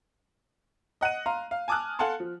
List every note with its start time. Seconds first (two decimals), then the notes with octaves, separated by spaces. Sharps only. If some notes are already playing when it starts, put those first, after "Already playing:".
1.01 D#5 F#5 F#6 D#7
1.26 F5 A#5 C6
1.51 F5
1.68 G#5 A5 D6 D#6 F6 F#6
1.99 A4 F5 F#5 G#5 A5 C6
2.20 F3